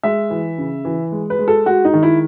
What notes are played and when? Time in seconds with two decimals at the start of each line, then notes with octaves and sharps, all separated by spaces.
0.03 G#3 E5
0.30 E3
0.58 C#3
0.85 E3
1.12 G#3
1.30 B4
1.39 G#3
1.48 A4
1.66 G#3 F#4
1.85 D#4
1.93 D#3
2.03 E4